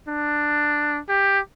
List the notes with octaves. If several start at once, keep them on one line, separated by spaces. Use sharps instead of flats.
D4
G4